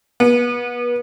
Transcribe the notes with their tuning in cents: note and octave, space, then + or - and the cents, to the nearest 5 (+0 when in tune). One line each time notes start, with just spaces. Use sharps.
B3 -30